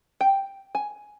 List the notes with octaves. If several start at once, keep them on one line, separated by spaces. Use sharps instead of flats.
G5
G#5